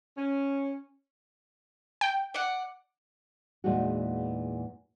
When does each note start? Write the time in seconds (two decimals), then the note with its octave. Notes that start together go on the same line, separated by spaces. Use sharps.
0.17 C#4
2.01 G5
2.34 D5 F#5
3.64 E2 A#2 E3 G#3 D#4 F#4